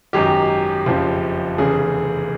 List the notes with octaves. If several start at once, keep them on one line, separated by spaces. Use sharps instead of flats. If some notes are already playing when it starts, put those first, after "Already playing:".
G#1 F#2 D#3 G4
F#1 F2 C#3 F3
F1 E2 C#3 G#4